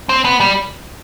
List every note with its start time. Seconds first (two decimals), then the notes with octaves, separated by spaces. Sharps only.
0.09 C4
0.25 B3
0.40 G3